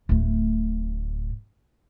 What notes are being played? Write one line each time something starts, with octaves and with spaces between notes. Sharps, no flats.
D1 A2